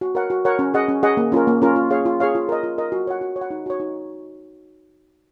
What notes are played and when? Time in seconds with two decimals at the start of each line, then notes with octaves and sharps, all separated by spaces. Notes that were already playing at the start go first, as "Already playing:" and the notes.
0.01 F#4
0.15 A#4 C#5 F#5
0.30 F#4
0.45 A#4 C#5 F#5
0.59 C#4
0.74 G#4 D#5 F#5
0.88 C#4
1.03 G#4 D#5 F#5
1.17 A#3
1.32 C#4 F4 A#4
1.47 A#3
1.62 C#4 F4 A#4
1.76 F4
1.90 G#4 C#5 F5
2.05 F4
2.20 G#4 C#5 F5
2.35 F4
2.49 A#4 D#5
2.63 F4
2.78 A#4 D#5
2.92 F#4
3.07 C#5 F#5
3.21 F#4
3.36 C#5
3.41 F#5
3.51 D#4
3.66 F#4 C#5
3.80 D#4